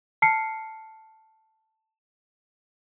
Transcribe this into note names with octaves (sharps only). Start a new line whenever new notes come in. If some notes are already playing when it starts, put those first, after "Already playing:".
A5 F6 C7 C#7